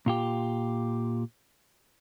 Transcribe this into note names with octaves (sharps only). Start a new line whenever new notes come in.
A#2 F4 G4